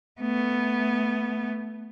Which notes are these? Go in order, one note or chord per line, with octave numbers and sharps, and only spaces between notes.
A3 B3